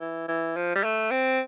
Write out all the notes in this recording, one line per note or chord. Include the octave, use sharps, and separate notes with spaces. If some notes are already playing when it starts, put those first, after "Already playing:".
E3
E3
F3
G3
A3
C4